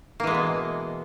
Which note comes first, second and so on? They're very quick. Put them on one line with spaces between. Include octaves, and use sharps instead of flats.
A#3 E3 G#3 B2 B3